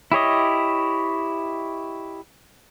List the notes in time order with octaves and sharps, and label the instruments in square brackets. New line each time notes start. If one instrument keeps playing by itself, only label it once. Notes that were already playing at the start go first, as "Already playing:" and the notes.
[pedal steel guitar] E4 G4 C#5 D#5